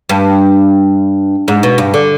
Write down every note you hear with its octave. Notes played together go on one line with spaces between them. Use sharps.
G2
G#2
B2
G2
D3